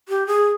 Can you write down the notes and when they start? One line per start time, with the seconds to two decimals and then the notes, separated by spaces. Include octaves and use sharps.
0.09 G4
0.27 G#4